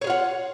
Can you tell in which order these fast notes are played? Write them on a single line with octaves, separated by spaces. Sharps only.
C#5 G#4 F4 F#5